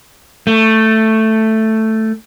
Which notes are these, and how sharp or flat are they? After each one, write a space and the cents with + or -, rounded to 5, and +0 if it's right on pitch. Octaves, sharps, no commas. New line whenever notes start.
A3 +5